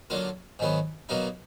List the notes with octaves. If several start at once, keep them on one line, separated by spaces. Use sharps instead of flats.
D3 F#3 A#3 F4
G#2 D#3 F#3 B3
B2 F#3 A#3 D#4